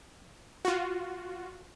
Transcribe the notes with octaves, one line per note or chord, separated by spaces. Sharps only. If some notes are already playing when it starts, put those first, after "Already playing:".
F4 F#4